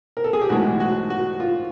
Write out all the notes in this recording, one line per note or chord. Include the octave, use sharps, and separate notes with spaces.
A#4
A4
G#4
G4
B1 A2 E3 G#3 F#4
F#4
F#4
F4